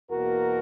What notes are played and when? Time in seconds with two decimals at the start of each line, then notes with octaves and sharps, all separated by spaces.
0.10 E2 B2 A#3 F#4 A#4